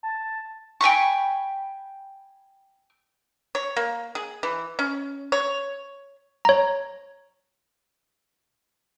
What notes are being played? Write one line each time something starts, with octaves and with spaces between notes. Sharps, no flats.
A5
G5 G#5 B5 C#6
C#5
A#3
G#4
E3
C#4
C#5
C#5 A#5